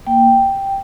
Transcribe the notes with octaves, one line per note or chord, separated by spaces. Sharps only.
A#3 G5